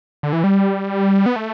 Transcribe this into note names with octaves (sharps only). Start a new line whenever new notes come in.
D3
E3
G3
B3
A3